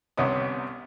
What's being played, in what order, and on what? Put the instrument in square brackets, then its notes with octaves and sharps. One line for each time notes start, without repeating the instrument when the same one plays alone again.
[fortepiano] C2 C3 B3 C#4 D#6